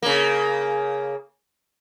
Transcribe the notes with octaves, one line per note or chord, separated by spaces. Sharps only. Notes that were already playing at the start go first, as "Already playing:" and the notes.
C#3 A#3